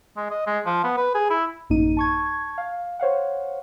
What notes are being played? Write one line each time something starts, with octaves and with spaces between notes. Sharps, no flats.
G#3
D#5
G#3
F3
B3
B4
G#4
E4
A1 F#2 A#3 D#4 D#7
A5 C#6 G#6
F5
C5 C#5 F5 F#5